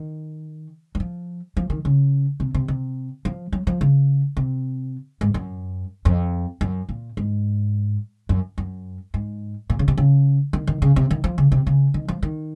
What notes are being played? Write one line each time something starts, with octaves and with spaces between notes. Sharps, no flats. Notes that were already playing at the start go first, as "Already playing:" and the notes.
Already playing: D#3
F#3
F3
F3
D#3
C#3
C3
C3
C3
F3
F#3
F3
C#3
C3
G#2
F#2
F2
F#2
A#2
G#2
F#2
F#2
G#2
A#2
C#3
C3
C#3
D#3
D#3
C#3
C3
D#3
F3
C#3
C3
C#3
D#3
F3
D#3